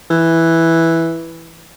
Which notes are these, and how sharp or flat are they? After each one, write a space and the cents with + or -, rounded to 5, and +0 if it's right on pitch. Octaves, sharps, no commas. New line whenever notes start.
E3 +0